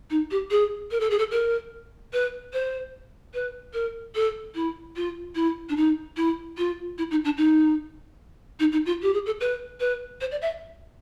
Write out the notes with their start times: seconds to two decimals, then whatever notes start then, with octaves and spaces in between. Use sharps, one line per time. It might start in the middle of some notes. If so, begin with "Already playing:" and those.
0.10 D#4
0.31 G4
0.51 G#4
0.91 A#4
1.00 A4
1.10 G#4
1.19 A4
1.31 A#4
2.13 B4
2.53 C5
3.34 B4
3.74 A#4
4.15 A4
4.55 E4
4.96 F4
5.35 E4
5.69 D4
5.77 D#4
6.17 E4
6.58 F4
6.98 E4
7.11 D#4
7.25 D4
7.37 D#4
8.60 D#4
8.72 D#4
8.86 F4
9.02 G4
9.14 G#4
9.26 A4
9.41 B4
9.80 B4
10.21 C5
10.31 D5
10.42 E5